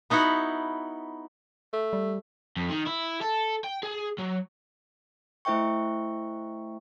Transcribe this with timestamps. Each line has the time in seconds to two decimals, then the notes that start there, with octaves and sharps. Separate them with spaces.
0.10 B3 D#4 E4 F#4 F#5
1.73 A3
1.93 G3
2.57 F2
2.70 D#3
2.86 E4
3.21 A4
3.64 G5
3.83 G#4
4.18 F#3
5.45 A3 E4 C5 E5 G5 C#6